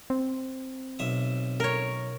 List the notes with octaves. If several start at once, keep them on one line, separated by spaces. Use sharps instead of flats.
C4
B1 E5 D#6
A#4 C#5